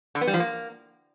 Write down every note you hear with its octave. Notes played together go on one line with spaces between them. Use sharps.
D3
B3
G3
F3
A#3